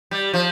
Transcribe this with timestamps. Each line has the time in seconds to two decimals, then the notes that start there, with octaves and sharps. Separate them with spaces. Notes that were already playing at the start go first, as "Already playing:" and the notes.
0.11 G3
0.34 F3